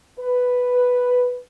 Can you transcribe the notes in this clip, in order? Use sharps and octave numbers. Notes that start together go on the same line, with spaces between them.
B4